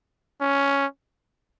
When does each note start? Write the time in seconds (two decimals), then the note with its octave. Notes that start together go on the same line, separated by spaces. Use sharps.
0.41 C#4